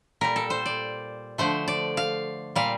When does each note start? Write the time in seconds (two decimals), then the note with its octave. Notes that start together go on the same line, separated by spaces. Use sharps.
0.21 A#2 G3 A#4
0.36 A4
0.50 C5
0.66 D5
1.38 D3 F3 A3 C5
1.68 D5
1.97 F5
2.56 A#2 G3 F5